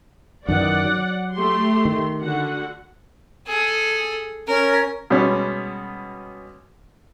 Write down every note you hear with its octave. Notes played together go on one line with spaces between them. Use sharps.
F#2 D#3 E3 D5 F#5
F#3
A3 G4 C6
D#3
D3 F#4 F#5
G#4 A4
C#4 A#4
B2 G3 G#3 C#4